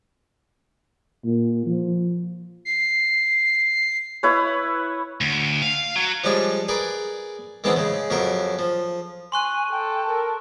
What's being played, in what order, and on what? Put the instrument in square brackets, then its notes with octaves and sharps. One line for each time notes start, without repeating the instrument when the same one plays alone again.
[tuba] A#2
F3
[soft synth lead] C7
[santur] E4 B4 C#5
[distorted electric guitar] D2
F5
F#3
[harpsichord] F3 G3 G#3 D4 C#5
G#4 A#4 B4 D5
D#3 E3 G#3 B3 C4 D4
C#3 G#3
F2 C#3 F#3 A#4 C#6
F3
[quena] G#5 [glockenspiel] C6 C#6 F#6
[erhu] A4 [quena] G5
[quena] A#4